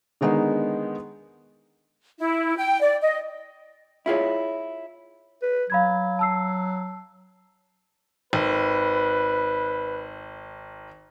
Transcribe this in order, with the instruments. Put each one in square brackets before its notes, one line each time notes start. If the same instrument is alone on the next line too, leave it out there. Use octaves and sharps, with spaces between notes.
[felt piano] D3 D#3 G#3 B3 D#4
[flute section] E4
G5
D5
D#5
[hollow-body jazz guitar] E4 F4 G#4 C#5
[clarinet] B4
[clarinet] F#3 [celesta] F5 B5 G#6
[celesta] A5 E6 C7
[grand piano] G#1 [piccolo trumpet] B4